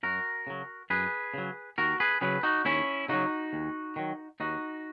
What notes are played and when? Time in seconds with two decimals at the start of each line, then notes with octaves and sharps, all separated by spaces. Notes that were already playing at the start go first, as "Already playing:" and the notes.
0.03 F#2 F#4 A#4
0.47 C#3 F#3
0.90 F#2 G#4 B4
1.34 C#3 F#3
1.78 D#2 F#4 A#4
2.00 G#4 B4
2.21 C#3 F#3 G#4 B4
2.43 D#4 F#4
2.65 D#2 C#4 E4
3.09 C#3 F#3 D#4 F#4
3.53 D#2
3.96 D#3 F#3
4.40 D#2 D#4 F#4